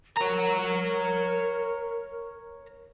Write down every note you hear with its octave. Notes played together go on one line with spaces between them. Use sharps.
A#4 C#5 A#5